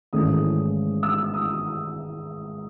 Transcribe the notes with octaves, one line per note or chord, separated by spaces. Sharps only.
G#1 G#2 E3 A3 C#4 D#6
E6
D#6